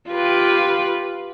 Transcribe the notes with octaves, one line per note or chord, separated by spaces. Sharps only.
F4 G4 B4